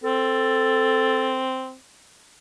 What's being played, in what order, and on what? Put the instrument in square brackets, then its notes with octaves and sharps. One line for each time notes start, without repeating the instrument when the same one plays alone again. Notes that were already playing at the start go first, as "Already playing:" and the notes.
[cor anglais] C4 [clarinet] A4